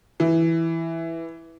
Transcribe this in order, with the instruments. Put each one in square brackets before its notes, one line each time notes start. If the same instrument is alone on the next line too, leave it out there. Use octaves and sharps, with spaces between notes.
[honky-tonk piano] E3